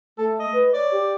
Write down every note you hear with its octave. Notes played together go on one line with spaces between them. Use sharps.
A3 A4
D#5
B4
C#5 D5
G4